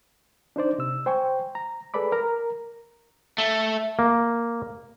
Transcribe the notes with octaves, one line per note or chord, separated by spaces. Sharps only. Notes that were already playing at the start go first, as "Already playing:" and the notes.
D4 D#4 C5 D5
C3 E6
C5 G5 G#5 C#6
A#5
G#4 A4 B4 D5 B5 D6
A#4 A#5
A3
A#3